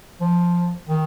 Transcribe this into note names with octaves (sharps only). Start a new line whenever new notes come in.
F3
D#3